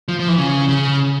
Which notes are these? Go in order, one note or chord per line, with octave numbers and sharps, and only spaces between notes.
F3
F3
E3
C#3
C#3